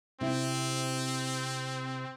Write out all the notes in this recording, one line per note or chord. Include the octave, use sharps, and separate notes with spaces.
C3 C4 E4